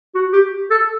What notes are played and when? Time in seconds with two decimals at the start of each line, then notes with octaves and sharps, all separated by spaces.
0.15 F#4
0.33 G4
0.70 A4